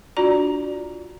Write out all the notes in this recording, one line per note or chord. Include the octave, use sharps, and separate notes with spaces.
D4 F4 F#4 D5 A#5